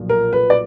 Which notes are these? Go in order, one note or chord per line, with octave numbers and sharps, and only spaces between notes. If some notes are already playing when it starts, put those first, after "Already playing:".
Already playing: B1 A#2 F3
A#4
B4
D5